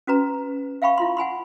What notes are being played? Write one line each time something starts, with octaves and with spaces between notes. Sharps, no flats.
C#4 F#4 B4 A#5
E5 F5 G5 B5 C#6
E4 F4 C6
F#5 G#5 B5 C6